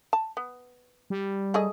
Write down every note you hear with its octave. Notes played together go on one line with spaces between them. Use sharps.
A5
B3
G3
A3 G#4 D#5